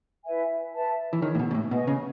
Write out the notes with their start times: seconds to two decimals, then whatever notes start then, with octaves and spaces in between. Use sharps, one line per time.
0.24 E4 B4 E5 G#5
0.74 B4 E5 A5
1.13 E3
1.22 D#3 D#4 G#4 C#5
1.35 A2
1.39 B2
1.51 B2
1.55 A2
1.71 B2 B4 D#5 G#5 C#6
1.87 C#3